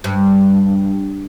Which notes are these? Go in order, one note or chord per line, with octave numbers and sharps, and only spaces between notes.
G2